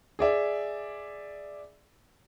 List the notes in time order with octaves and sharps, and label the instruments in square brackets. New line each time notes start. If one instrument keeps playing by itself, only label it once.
[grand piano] G#4 D5 E5